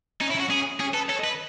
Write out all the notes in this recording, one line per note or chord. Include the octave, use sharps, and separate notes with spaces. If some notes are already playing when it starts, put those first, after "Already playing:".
C#4 D#4
E4
C#4
F#4
C#4 G#4
C#4 G#4
A4 B4
A4 C#5
D#5
B4